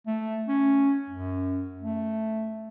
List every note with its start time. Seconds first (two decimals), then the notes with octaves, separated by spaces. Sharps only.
0.06 A3
0.48 C#4
1.10 F#2
1.82 A3